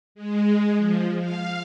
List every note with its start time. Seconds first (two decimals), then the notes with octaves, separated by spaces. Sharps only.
0.15 G#3
0.77 F3
1.20 F5